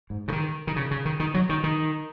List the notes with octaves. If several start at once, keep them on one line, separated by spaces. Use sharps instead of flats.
G#2
C#3
D#3
D#3
C#3
C#3
D#3
D#3
F#3
D#3
D#3